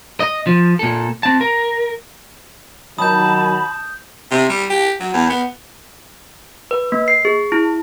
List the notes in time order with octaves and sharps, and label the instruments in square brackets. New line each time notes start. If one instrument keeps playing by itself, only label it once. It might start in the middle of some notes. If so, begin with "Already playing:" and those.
[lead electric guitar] D#5
F3
A#2 A4
C4 A5
A#4
[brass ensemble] D#3 F#3 [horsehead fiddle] A5 [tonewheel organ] B5 [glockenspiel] D#6 G6
[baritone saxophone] C3
G3
G4
F#3
E2
B3
[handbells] B4
A#3
C7
G#4
E4